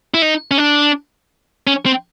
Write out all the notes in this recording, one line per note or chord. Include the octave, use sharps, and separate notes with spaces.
E4
D#4
C#4
D4
C#4
C4